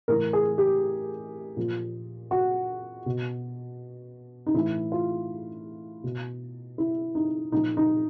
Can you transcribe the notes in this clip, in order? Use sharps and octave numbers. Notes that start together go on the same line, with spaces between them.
A2 E3 A#4
G#4
G4
A#2 F3
F#4
B2
D#4
A2 E3 E4
F4
B2
E4
D#4
A#2 F3 D#4
D#4